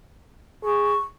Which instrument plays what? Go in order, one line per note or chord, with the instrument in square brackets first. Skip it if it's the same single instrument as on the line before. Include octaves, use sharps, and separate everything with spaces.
[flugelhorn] G#4 [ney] C#6